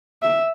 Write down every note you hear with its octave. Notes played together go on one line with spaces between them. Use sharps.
E5